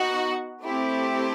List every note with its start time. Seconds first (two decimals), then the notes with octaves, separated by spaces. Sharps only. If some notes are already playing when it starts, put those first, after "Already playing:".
Already playing: B3 D#4 F#4 F#5
0.63 A3 C4 E4 G4